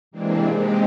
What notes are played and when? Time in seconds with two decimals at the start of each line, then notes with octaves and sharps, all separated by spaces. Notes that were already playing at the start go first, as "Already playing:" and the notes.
0.11 C3 E3 G#3 A#3 C4 D4
0.50 G#3 C4 D#4 G4